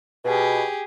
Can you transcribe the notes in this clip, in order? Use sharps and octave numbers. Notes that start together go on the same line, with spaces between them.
B2 G4 G#4